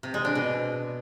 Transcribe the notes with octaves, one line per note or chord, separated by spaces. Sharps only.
C3
G#3
D4
B2